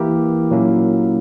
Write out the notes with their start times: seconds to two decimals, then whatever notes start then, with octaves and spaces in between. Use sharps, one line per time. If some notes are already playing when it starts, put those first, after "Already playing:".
Already playing: E3 A#3 E4 G4 A#4
0.51 A#2 F#3 A#3 C#4 E4